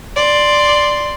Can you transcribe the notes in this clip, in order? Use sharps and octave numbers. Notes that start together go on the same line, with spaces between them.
D5 C6